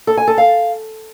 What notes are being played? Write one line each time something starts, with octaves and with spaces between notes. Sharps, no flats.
A4
G#5
A4
F5